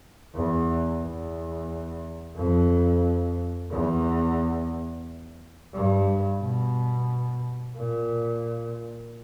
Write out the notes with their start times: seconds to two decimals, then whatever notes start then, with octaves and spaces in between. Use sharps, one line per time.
0.34 E2
1.02 E2
2.36 F2
3.71 E2
5.73 G2
6.41 B2
7.76 A#2